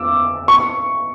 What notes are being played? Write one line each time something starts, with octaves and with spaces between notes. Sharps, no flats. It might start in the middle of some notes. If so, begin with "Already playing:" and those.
Already playing: D6 E6
C#6